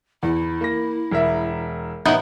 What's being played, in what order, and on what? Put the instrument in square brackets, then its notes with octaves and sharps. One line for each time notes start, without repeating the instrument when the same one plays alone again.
[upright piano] E2 [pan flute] E4
[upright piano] A#3 A#6
E1 A#4 E5
[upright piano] A1 [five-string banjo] B3 D#4 E4